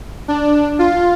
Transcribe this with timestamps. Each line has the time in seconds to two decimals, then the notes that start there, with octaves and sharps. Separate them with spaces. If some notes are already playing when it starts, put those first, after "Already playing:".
0.28 D4
0.79 F4